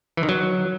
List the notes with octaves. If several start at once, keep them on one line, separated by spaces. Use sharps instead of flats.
E3
D#3
F#3